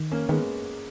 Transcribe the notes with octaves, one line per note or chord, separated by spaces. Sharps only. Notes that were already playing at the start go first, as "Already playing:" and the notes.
Already playing: D#3
A#3 C#4
D#3 G#3 B3